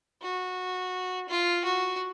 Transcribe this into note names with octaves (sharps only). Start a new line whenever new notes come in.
F#4
F4
F#4